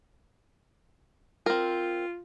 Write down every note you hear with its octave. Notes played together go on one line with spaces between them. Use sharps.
C4 F4 A#4